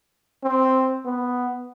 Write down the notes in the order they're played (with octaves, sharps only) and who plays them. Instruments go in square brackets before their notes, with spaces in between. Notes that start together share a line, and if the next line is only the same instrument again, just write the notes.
[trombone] C4
B3